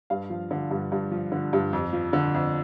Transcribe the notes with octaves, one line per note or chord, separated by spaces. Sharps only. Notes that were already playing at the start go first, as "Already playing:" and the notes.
G2 F5
F3
D3
G2
G2
F3
D3
G2
F2
F3
D3
F2